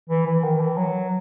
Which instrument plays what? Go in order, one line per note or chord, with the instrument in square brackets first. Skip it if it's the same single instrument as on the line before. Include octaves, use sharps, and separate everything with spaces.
[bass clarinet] E3
E3
D#3
E3
F#3